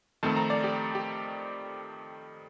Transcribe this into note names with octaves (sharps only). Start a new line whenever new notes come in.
F2 D#3 A3 C4 A5
A#5
D5
G4
G4